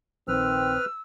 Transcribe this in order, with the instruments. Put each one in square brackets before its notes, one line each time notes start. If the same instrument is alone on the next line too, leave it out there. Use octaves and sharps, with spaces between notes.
[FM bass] A#1 [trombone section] D#3 C4 [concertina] B4 F6 [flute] E6